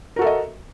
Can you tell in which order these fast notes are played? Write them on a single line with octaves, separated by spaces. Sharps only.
A#4 F#4 A4 E5 D#5